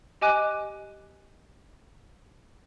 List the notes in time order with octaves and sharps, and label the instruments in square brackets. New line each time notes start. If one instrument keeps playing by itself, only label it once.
[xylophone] G4 D#5 G#5 D6 F#6